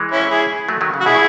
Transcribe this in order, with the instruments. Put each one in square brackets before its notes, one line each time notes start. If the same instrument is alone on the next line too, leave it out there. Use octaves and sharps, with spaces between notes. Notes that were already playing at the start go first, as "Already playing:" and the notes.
Already playing: [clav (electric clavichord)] E3 G#3
[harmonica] C#4 E4
E4 G#4
[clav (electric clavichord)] F#3 A3
D#3 F#3
C#3
[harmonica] F#4
[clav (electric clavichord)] B2 [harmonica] E4 G#4